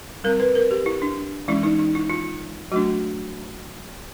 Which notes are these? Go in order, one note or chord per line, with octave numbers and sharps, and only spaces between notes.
G3 C4 A#4
B4
A#4
G4
E4
D4
E3 G#3 C#4 E4
D#4
D#4
E4
F4
F#3 A3 D4 F#4